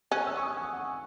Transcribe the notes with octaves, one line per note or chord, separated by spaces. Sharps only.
C#4 F#6
E6
C#6
D#6
G#5
F#5